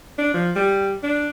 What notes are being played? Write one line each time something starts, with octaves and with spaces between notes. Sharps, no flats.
D4
F3
G3
D4